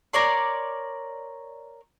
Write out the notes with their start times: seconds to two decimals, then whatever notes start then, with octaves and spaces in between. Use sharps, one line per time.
0.13 A#4 C#5 D5 C6